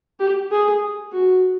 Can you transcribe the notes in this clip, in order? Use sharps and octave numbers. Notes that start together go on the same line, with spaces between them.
G4
G#4
F#4